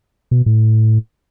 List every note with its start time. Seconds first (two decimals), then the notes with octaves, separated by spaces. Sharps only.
0.31 B2
0.46 A2